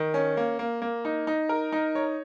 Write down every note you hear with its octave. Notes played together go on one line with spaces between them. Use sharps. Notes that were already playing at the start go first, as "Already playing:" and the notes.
Already playing: D#3
C#4
A#3
A#3
A#3
D#4
D#4
A#4
D#4
C#5